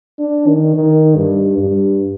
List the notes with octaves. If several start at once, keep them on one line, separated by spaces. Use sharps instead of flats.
D4
D#3
D#3
G2
G2